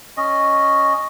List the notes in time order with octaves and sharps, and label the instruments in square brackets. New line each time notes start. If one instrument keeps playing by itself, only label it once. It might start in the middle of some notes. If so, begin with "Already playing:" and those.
[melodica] C#4 D#5